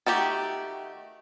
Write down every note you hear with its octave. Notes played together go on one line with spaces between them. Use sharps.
D#3 A3 F#4 G4